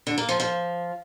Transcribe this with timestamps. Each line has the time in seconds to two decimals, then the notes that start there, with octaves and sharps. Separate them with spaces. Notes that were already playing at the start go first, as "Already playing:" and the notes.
0.07 D3
0.18 A#3
0.29 F3
0.40 F3